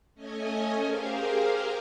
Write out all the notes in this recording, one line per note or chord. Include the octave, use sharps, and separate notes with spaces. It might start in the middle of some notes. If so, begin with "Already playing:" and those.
A3 C#4 D#5 G#5
G4 G#4 A#4 C5 F5